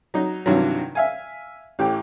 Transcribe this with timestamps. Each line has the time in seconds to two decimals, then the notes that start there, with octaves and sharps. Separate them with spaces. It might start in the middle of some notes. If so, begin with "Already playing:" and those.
0.14 F#3 D#4
0.46 G2 C3 D#3 E3 F#3
0.95 E5 F5 G#5
1.79 A1 E3 G4 G5